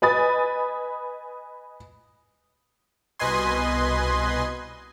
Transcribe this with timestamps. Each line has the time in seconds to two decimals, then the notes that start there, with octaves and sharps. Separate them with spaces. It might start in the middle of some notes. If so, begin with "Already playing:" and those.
0.02 B4 D#5 G#5 B5 D#6 A6
3.19 C2 B2 B4 D#5 G#5 C6